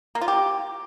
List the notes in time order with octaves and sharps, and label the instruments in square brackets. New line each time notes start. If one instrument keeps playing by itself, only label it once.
[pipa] A#3
F4
G4